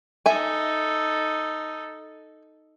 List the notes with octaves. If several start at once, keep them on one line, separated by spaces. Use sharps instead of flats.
D#4 A4 E5 G#5